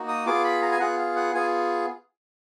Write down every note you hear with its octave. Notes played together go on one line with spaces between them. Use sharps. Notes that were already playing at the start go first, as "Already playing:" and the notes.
Already playing: A#3 D#4 F#4
D#6
B3 F4 G#4 D6
B5
A#5
G#5
B3 F4 G#4 F#5
F5
F#5
B3 F4 G#4 G#5